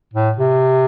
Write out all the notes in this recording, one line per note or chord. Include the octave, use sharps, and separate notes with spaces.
A2
C3